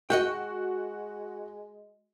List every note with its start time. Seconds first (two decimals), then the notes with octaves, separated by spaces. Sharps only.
0.10 G#3 F#4 D#5 F#5 G5